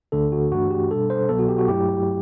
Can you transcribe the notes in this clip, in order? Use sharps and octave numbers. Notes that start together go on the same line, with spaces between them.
D2 D3 A3 D4 A4
F#4
G2 E3 A3 D4 F#4
G4
B2 G3 D4 A4
C5
C2 B2 F#3 B3 A4
F#4
G4
F#4
G2 F#3 A3 E4 G4